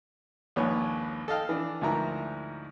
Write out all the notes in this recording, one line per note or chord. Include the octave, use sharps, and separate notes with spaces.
A#1 D#2 G#2 B4 C#5
A4 D#5 F5 G5
E3 D4
D2 G#2 F3 E4 A#4 A#5